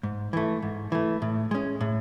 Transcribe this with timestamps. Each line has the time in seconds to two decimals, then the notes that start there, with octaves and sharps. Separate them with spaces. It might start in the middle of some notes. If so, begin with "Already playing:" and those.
0.03 G#2
0.33 E3 A3
0.62 G#2
0.92 E3 A3
1.22 A2
1.51 G#3 C#4
1.81 A2